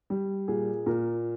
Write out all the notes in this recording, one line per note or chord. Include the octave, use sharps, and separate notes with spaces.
G3
A#2 G#4
A#2 A#4